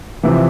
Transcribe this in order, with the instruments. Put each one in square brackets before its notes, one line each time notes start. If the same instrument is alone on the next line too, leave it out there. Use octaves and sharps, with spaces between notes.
[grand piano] C3 E3 F3